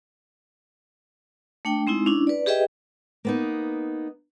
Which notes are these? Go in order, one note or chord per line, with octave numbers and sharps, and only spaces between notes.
A3 D4 G5
G#3 C4 D#4 E4
C#4 D4 E4
B4 D5
G4 G#4 B4 D#5 E5 G5
A#3 B3 D#4